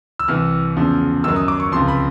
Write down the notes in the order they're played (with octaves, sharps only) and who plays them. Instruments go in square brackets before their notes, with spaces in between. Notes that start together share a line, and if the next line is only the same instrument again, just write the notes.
[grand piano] E6
C2 C3 E3 F6
E2 C#3 F3
F#2 D#3 F#3 E6
D#6
D6
C#6
C#2 C3 F3 C6
B5